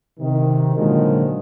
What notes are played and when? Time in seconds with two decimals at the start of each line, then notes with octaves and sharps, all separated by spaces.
0.19 C3 D#3
0.76 A#2 D3 D#3 F3 F#3 G#3